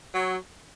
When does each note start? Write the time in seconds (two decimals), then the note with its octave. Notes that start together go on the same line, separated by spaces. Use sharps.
0.14 F#3